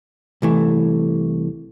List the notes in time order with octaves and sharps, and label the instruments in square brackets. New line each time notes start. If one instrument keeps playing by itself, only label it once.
[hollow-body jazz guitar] C2 E3 A3